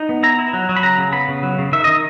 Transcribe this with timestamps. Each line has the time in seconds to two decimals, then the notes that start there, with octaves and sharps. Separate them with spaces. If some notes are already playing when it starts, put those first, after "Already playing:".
Already playing: D#4
0.09 B3
0.23 E4 A#5
0.39 E4
0.53 F#3
0.69 F#3
0.76 B5
0.83 C#3 A#5
0.98 C#3
1.12 B3 B5
1.28 C#3
1.43 F#3
1.58 C#3
1.72 D#3 E5
1.84 D#3 D#5